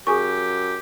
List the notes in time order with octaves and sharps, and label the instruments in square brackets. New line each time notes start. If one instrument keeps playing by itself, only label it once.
[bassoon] F#2 [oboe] G4 [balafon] G#4 G#5 C#6